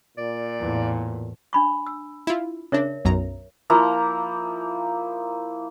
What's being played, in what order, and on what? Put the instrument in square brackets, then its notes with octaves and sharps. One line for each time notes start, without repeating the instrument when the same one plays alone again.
[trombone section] A#2 [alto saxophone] D5
[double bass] E2 A2
[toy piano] D4 B5 C#6
E6
[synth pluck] E4 F4
[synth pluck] C#3 D4 [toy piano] A#4 C#5 E5
[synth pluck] B1 F#2 A#5
[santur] F3 A#3 E4 A#5